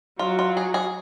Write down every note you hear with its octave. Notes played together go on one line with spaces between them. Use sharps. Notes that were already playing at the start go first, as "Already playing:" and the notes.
F#3 F4
F4
G#4
G#4